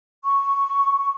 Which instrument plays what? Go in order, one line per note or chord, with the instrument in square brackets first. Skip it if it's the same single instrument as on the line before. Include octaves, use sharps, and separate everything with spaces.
[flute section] C#6